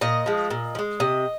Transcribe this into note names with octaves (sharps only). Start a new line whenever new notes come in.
A#2 D#5
F3 G#3
A#2
F3
G#3
C3 D#5